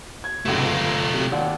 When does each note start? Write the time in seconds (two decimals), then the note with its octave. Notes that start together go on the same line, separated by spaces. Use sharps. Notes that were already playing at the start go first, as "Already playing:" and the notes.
0.24 G#6
0.45 F1 C#2 A3 F4
0.59 G1
1.14 C3
1.32 D#2 D5 F#5